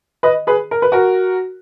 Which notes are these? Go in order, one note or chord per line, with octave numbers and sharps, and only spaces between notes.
B4 D#5
G#4 B4
A#4
B4
F#4 A#4